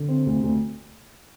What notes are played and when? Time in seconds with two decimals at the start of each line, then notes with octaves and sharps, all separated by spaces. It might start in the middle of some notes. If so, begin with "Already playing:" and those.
Already playing: D3
0.09 C4
0.26 D2
0.43 D2